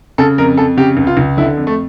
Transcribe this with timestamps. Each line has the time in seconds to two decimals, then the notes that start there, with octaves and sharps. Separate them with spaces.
0.18 C#3 A4
0.38 F2 A#4
0.57 F2 A4
0.77 C#3 G4
0.97 C#2
1.07 F4
1.17 C#2
1.37 D3 E4
1.57 F2
1.67 A3